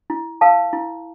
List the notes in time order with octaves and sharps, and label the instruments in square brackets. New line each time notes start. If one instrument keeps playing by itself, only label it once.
[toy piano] E4
A#4 F5 A5
E4